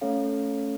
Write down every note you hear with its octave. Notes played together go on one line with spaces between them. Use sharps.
A3 C#4 A4 C#5 F5